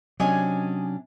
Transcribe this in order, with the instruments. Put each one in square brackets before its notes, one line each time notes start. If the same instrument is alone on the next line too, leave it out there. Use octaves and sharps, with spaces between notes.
[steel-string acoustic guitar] C3 C#4 D4 [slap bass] F#3 [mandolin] D#5 G#5